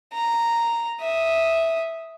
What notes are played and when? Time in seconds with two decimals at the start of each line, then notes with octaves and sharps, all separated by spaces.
0.14 A#5
1.01 E5 D#6